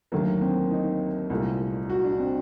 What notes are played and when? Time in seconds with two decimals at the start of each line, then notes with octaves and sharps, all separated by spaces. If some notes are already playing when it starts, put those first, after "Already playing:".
0.12 D#2 D3 F#3 A3 A#3
0.41 C4
0.71 D#4
1.30 C2 A#2 A3
1.90 F#4
2.04 D4
2.19 C4